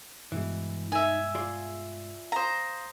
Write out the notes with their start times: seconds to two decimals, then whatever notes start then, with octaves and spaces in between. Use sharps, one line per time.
0.32 G2 B2 E3 G#3
0.92 D#4 E5 G#5
1.35 F4 G#4 D5
2.32 C5 F5 A#5 D#6